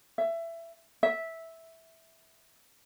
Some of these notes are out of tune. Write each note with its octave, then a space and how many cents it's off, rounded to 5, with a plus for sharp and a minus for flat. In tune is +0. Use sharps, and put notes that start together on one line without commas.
E5 +20
E5 -10